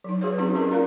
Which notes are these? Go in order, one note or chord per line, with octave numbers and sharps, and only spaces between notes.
F#3 D#4
D#4 F#4 G#4 B4 C#5
F#3 C4 C#4 D#4 E4 G#4
C#4 E4 G4 G#4 A#4 D#5
A#3 F4 A#4 D5 F5 A#5